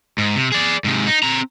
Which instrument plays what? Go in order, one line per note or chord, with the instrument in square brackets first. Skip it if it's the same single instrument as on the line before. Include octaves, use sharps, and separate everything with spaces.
[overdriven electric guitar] G#2
C3
G#4 D5
G#2 C3
D#4
C4 A#5